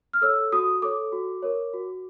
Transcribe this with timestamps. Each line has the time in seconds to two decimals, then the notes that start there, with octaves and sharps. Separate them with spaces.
0.13 F6
0.21 A4 C#5 E6
0.52 F#4 D#6
0.82 A4 C#5 D6
1.13 F#4
1.42 A#4 C#5
1.73 F#4